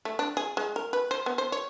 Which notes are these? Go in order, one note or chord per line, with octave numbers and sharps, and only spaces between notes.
A3
D4
G#4
G#3
A#4
B4
C5
B3
C5
C#5